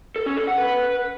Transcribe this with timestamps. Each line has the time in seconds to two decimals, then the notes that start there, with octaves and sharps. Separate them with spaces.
0.16 A4
0.26 C#4
0.37 A4
0.47 F#5
0.58 B4